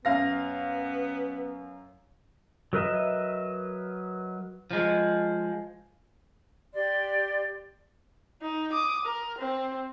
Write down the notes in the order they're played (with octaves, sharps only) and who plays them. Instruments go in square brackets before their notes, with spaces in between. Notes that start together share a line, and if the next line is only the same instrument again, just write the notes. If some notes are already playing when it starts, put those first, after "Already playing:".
[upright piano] F#2 F5 A#6 [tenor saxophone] B3
[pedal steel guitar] F#3 A#4 B4 D#5 E5
[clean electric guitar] F3 G#3
[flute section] G4 D5 C6
[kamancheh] D#4
D6 D#6
A#4
C4